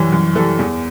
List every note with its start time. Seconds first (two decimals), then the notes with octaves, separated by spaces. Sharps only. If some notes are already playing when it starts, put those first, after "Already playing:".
Already playing: F#2 E3 G3 C#5
0.12 F#2
0.35 E3 G3 A4
0.59 E2